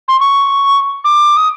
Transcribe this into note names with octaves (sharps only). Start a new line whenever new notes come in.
C6
C#6
D6
D#6